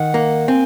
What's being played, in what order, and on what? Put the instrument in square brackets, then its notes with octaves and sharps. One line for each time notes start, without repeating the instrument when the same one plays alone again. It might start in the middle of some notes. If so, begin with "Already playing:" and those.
Already playing: [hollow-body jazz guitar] D#3 [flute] F#5
[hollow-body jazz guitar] A#3
[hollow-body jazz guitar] C4 [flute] G#5